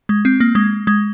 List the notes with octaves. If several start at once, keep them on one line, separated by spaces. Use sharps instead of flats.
G#3
C4
A#3
G#3
G#3